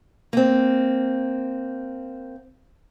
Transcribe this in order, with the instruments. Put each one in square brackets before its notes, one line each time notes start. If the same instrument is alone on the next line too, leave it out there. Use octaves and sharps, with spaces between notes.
[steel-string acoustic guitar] A#3 C4